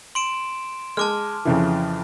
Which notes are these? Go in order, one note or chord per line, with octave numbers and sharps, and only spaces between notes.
C6 D7 E7
G#3 A5 D6 F6
F2 C#3 E3